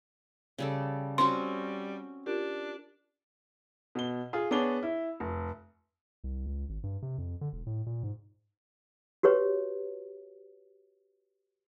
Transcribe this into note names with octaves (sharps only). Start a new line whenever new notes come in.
C#3 G3 A4
G3 C4 C#4 F#4 C6
D4 F4 G4 A#4
B2 G7
F4 G#4
B3 D4 G#4 C#5 G7
E4
F1
C2
C#2
G#1
G2
C3
F2
D3
E1
A2
A#2
G#2
F#4 G4 B4 C#5